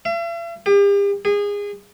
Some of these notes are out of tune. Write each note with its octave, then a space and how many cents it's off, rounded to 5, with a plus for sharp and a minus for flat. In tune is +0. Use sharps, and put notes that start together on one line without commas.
E5 +45
G4 +40
G#4 -25